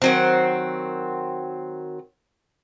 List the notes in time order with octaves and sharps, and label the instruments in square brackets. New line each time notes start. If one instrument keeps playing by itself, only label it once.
[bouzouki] D#3 F#3 C4